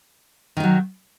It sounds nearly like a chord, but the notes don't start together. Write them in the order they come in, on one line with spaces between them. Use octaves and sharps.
D#3 D#4 F#3